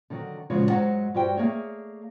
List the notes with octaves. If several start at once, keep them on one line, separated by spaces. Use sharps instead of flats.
D3 D#3 F#3
A#2 C#3 F3 G#3 F#4 C#5
G#2 F#3 G#3 F#5
G2 G3 F#4 C5 G5
A3 A#3 G#4 C#5